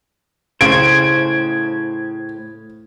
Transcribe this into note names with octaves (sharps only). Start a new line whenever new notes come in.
A2 C#3 C5 G#6 D7